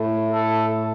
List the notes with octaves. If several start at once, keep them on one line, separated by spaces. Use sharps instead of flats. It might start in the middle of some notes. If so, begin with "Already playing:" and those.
Already playing: A2 A3
A4